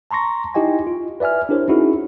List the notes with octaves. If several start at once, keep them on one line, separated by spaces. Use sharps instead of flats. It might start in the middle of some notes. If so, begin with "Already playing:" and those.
A5 A#5 C6 C#6 A#6
D#4 E4 G4 D#5 G5 G#5
F4
B4 D5 E5 G#5 F6
D4 E4 G4 A#4 C5 C#5
C#4 D#4 E4 F#4 G#4